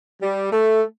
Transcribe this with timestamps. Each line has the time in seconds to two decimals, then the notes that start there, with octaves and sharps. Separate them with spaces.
0.21 G3
0.51 A3